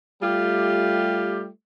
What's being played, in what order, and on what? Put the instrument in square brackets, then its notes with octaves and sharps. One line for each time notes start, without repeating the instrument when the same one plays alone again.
[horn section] G3 A3 F4 G4